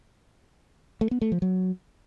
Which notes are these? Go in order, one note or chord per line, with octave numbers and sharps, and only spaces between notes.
A3
B3
A3
F3
F#3